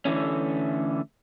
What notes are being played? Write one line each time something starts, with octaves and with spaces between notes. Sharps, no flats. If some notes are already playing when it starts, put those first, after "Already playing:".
D3 E3 A3 C#4